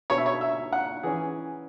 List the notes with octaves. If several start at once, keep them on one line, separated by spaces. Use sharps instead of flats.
B2 B3 C#5
E5
C#5
E5
F#5
E3 C#4 G#4